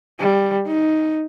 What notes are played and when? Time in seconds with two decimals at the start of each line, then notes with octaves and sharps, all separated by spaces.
0.19 G3
0.66 D#4